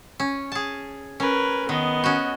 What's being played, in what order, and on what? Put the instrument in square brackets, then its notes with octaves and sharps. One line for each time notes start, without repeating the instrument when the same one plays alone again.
[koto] C#4
G#4 A5
[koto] C#4 [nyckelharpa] A#4 B4
[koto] D#3 [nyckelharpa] B3 D#5
[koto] C#4 F#4